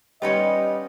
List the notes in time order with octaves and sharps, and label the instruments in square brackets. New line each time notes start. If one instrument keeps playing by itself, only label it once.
[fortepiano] G3 G4 [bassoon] B3 [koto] C#4 D#4 F4 [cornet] D#5